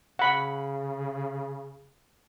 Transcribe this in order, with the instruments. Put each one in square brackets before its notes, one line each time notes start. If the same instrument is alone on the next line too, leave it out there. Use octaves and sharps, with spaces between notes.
[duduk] C#3 [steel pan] F#5 B5